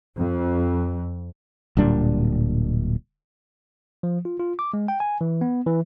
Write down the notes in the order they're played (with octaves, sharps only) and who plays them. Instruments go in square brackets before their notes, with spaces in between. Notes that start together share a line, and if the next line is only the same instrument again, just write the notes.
[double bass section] F2
[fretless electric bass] D1 A#2 G3 D4
[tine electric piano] F3
F4
F4
D6
G#3
G5
G#5
E3
B3
E3